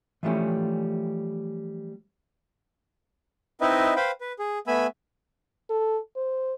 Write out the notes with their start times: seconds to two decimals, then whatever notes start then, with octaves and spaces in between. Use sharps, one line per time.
0.23 E3 F3 G3 A3 C#4
3.61 C4 D#4 E4 B4 D#5 E5
3.96 B4 C5 F5 G5 B5
4.21 B4
4.39 G#4
4.67 A3 B3 G#5 B5 E6
5.70 A4
6.16 C5